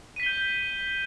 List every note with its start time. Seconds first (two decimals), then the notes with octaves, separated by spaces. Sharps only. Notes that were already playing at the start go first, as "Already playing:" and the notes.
0.16 D#7
0.20 B6
0.23 G7
0.26 G6